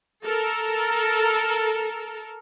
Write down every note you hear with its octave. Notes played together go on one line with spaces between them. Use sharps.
A4 A#4